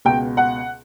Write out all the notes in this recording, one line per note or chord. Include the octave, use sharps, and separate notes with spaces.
C#2 B2 G5
F#5